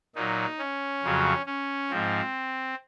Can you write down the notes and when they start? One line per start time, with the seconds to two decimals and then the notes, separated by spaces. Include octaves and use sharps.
0.15 A#2 F#3 D#4
0.59 C#4
1.03 F2 C#3 F#3
1.46 C#4
1.90 G#2 F3 C4